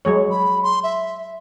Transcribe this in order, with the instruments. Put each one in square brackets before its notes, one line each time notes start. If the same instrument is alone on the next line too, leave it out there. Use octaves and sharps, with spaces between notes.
[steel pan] F#3 G#3 C#5
[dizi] B5
C6
E5